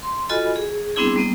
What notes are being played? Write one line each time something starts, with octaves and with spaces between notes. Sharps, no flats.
C6
F4 F#4 A4 D#5 G#5 B5
G#4
G3 B3 C4 D4 E4 G#4
G3 A#3 B3 G5